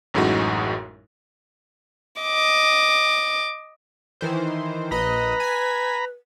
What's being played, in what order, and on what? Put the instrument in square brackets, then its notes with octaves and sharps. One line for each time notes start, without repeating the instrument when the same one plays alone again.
[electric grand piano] A1 F#2 A2 G#3 D#4 F#4
[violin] D#5 D6
[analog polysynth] D#3 E3 C5
[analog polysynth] A#1 D#5 [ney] B4 [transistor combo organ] A#5 B5
[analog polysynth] G#5 B6